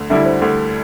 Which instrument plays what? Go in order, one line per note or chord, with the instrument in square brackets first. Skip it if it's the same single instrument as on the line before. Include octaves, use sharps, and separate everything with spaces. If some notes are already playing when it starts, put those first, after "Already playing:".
Already playing: [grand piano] D2
[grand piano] D3 G3 E4 [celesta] E5
[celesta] C5
[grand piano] D2 [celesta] A4